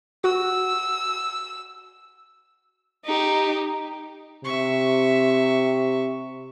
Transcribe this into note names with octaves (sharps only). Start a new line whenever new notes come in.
F#4 E6
D#4 G4
C3 E5 C#6